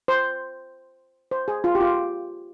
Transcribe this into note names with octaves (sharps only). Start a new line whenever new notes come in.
C5
C5
G#4
F4
G4
F4